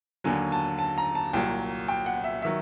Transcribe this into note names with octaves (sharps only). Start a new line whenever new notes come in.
D#2 D3 F#3 G#5
A5
A5
A#5
A5
C2 A#2 F#3 G5
G5
F#5
E5
D#3 F#3 E5